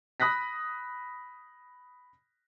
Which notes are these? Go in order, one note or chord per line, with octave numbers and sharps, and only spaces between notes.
B5 D#6 F#6 A#6 B6